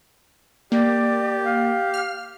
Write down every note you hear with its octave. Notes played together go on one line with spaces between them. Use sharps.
A#3 G4 D5
F5
F6